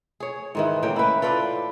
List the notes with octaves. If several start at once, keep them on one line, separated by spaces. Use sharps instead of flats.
G#4 C#5
G#2 D#3 E3
A2 A#3 C#4 G5
E4 B4
F4 A4 B4 D5